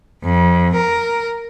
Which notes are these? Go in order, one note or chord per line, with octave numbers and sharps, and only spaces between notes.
F2
A#4